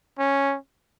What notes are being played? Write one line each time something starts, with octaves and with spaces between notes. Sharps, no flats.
C#4